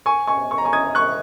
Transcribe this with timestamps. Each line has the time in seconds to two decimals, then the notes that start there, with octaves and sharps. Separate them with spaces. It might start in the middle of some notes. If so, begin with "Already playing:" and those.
0.06 G#5 C#6
0.27 G#5 C#6
0.51 C#6
0.58 A#5
0.65 G#5 C#6
0.73 D#6 G#6
0.95 C#6 F#6